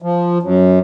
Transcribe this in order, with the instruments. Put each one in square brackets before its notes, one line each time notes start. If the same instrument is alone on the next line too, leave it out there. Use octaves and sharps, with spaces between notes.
[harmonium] F3
F#2